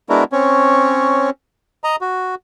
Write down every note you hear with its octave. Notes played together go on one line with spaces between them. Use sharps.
G#3 B3 D4 E4 F#4 A#4
C4 C#4 C#5
D#5 A#5
F#4